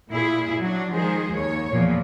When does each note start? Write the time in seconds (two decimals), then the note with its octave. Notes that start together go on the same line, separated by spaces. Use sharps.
0.11 A#2 E4 G#4
0.60 F#3 D4
0.92 D#3 F3 G#3 G#4 C5
1.31 D#2 C#5
1.72 E2 A#2 F3